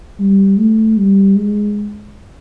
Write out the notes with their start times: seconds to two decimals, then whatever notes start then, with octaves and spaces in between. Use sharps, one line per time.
0.19 G3
0.57 A3
0.97 G3
1.36 G#3